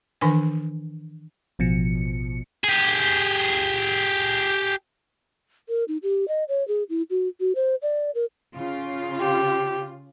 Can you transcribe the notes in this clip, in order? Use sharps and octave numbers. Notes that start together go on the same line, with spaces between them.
D#3 E3 D4 B4 G#5
A1 B2 F3 C#7
G4 G#4
A#4
D#4
G4
D#5
C#5
G#4
E4
F#4
F#4
C5
D5
A#4
C#3 F4
G4